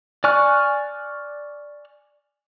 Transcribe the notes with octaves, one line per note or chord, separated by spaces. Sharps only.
D5 G#5 C#6 F6 F#6